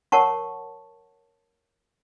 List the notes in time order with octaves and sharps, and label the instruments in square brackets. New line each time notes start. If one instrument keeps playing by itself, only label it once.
[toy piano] A#4 C#5 F#5 A5 C#6